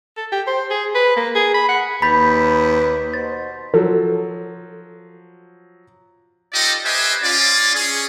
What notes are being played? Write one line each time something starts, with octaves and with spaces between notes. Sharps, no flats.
A4
G4
C5
G#4
B4
A#3
G#4
B5
F#5
D#2 B4 B5 G6 A6 B6
B2 C5 A6
F3 F#3 A4
D#4 F4 G4 A4 D5 D#5
G4 B4 C5 D#5 E5 G#5
C#4 F4 D5
C#4 G#4